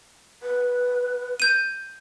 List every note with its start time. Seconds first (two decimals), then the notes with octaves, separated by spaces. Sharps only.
0.43 B4
1.40 G6 D#7